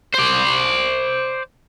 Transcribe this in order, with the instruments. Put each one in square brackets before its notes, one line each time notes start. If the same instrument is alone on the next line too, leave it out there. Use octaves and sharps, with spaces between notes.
[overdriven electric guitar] C5 D5